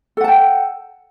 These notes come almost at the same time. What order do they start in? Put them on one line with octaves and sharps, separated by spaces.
A4 F#5 A5 G5